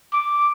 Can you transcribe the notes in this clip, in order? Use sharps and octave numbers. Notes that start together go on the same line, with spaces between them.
D6